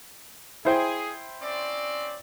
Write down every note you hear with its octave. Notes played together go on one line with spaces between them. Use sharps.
E4 G#4 C5 G5
C4 C#4 D5